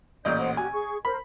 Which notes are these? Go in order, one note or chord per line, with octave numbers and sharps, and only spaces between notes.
A1 A#2 D5 D#5 G6
C5 F#5
F#4 G4 G#5
G#4 C#6
A#4 C5 B5